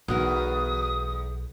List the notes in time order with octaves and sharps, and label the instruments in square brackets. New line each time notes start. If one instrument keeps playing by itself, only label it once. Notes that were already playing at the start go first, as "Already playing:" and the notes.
[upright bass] B1 [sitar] E2 [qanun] B3 F#4 A#4 [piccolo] D#6